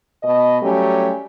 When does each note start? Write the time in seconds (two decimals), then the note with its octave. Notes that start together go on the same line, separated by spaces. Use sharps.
0.23 B2 D#5
0.62 F#3 G3 A3 C#4 G4